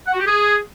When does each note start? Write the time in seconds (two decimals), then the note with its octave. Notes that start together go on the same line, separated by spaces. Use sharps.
0.07 F#5
0.14 F#4
0.20 G4
0.26 G#4